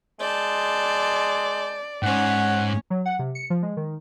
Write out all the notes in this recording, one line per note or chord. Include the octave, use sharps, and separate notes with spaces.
G#3 D5 A5 G6
G#2 C#4 C#5 F#5
F#3
F#5
C3
C#7
F3
G#3
D#3